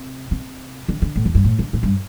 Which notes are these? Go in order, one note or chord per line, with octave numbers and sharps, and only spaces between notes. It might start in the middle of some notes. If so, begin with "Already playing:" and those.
Already playing: C3
C3
D3
D3
A2
E2
G2
A2
D3
A2
G2